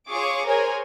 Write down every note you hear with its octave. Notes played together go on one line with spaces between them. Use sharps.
F4 G#4 C#5 C#6 D6
G#4 A#4 C5 C#5 G#5